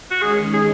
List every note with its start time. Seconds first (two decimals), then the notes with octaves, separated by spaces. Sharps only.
0.11 F#4
0.21 D#3 G#3 C#4 G#4
0.54 G#4